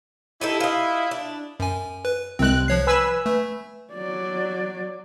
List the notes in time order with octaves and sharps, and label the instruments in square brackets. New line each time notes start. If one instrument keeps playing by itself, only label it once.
[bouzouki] D#4 G4 A4 [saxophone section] E4
[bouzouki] F4 D#5
D4
[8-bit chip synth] F#2 G#5
B4
[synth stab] C2 F#6 [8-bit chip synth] G#3 C4
[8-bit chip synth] F3 C#5 C7
[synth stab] B4 G#5 E6
[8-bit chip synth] A3
[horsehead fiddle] F#3 D5